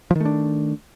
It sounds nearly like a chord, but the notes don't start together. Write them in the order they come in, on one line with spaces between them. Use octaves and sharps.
F3 D#3 A3 D4